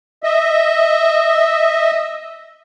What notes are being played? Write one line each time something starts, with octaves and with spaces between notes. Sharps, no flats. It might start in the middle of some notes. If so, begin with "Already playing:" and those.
D#5 E5